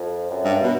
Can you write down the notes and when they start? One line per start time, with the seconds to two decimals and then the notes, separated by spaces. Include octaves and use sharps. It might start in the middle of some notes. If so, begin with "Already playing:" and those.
Already playing: F2
0.31 F#2
0.44 G2
0.63 B2